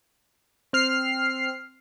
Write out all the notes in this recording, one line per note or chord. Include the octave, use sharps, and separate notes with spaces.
C4 F6 C7